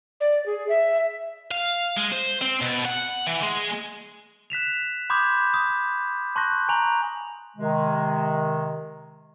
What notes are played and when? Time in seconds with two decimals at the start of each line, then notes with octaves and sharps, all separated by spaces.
0.21 D5
0.46 G#4
0.69 E5
1.51 F5
1.97 G#3
2.13 C5
2.42 C4
2.62 B2
2.85 F#5
3.27 E3
3.43 G#3
4.50 F#6 B6 E7 F7
5.10 B5 C6 D6 D#6 G6 G#6
5.54 D#6
6.36 A5 C6 C#6 F#6 G6 A#6
6.69 G#5 A#5 C#6 F7 F#7
7.56 C3 D#3 G#3